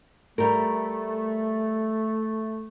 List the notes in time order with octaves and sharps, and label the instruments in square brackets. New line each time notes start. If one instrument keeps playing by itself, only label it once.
[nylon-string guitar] G3 A#4 [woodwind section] A3